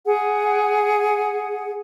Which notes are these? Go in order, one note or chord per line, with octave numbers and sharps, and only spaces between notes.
G#4 F#5